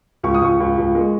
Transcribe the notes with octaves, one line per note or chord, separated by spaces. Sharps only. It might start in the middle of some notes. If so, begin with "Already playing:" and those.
C#2 C#6
D#6
C#2 C#6
C#2
C#2
G#3